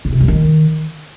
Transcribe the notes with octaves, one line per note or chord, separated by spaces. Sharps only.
D3
C3
G3
D#3